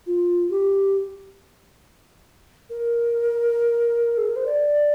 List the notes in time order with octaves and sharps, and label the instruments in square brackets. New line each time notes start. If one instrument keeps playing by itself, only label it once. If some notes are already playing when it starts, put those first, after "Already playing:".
[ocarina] F4
G4
A#4
G#4
A#4
C5
D5